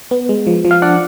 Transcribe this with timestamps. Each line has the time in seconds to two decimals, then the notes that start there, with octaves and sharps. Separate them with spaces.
0.11 B3
0.29 G#3
0.47 F3
0.65 F3
0.71 F5
0.82 D4 D5 F#5